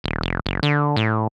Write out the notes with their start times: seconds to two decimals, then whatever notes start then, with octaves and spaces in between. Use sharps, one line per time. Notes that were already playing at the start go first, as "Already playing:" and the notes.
0.04 D#1
0.22 F1
0.46 F#1
0.63 D3
0.97 A2